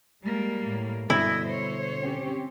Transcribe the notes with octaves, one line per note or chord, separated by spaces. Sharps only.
G3 G#3 A#3
A2
G2 B2 D3 E4 D#5 E5
C5 C#5
C4 C#4 G4